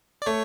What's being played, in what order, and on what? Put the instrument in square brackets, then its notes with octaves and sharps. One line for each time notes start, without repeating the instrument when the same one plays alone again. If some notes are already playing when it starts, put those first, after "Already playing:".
[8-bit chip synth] D5
[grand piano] A3 [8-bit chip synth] C#5